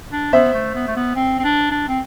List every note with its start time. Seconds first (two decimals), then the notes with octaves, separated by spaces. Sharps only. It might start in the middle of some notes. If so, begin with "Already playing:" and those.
0.12 D4
0.33 B3 C5 E5
0.54 A3
0.75 B3
0.88 A3
0.96 B3
1.16 C4
1.39 C4
1.44 D4
1.71 D4
1.88 C4